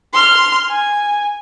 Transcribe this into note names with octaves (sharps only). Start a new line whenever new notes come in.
C6 F6
G#5